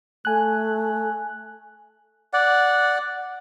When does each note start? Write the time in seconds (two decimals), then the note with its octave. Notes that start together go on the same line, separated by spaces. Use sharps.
0.25 A3 G#5 F#6
2.33 D5 F#5